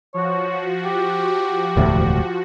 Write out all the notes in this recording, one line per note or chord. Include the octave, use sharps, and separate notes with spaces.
F3 F#4 C#5
G4
E1 D2 A2